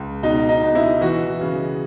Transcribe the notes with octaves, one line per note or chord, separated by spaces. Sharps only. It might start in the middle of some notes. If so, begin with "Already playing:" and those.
Already playing: C#2
B2 D#4
D#4
B2
E4
E3 F#4
C#3